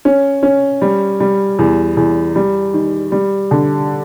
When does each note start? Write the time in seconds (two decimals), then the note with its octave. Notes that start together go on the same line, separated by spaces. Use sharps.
0.05 C#4
0.43 C#4
0.82 G3
1.20 G3
1.59 E2
1.97 E2
2.36 G3
2.74 D#3
3.12 G3
3.51 D3